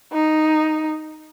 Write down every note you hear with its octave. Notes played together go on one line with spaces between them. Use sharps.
D#4